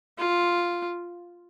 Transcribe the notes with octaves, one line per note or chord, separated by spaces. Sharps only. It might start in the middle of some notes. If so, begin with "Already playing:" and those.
F4